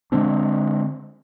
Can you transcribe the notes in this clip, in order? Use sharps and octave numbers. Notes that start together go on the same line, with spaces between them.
D3 G#3 C4 D4